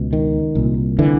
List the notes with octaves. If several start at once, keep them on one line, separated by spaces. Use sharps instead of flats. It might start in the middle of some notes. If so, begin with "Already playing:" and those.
Already playing: C#2 B2
D#3
C2 A#2
D3 E3